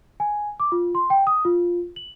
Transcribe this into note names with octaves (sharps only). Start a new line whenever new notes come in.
G#5
D6
F4
C6
G5
D#6
F4
F#7